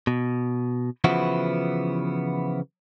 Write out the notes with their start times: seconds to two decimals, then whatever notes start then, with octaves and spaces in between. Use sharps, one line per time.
0.07 B2
1.04 C#3 E3 F3 B3 E4 F#4